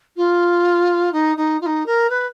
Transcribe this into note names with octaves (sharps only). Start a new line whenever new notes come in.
F4
D#4
D#4
F4
D#4
A#4
B4